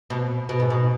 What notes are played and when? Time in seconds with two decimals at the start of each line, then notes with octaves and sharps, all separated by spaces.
0.10 B2
0.49 B2
0.60 G#2
0.70 B2